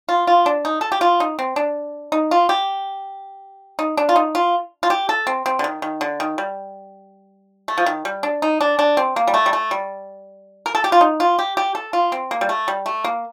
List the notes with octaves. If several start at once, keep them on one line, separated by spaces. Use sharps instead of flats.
F4
F4
D4
D#4
A4
G4
F4
D#4
C4
D4
D#4
F4
G4
D#4
D4
F4
D#4
F4
F4
G4
A4
C4
C4
D3
D#3
D#3
D3
D#3
G3
A3
F3
D#3
G3
D4
D#4
D4
D4
C4
A#3
G3
A3
G3
A3
G3
A#4
A4
G4
F4
D#4
F4
G4
G4
A4
F4
C4
A#3
G3
A3
G3
A3
A#3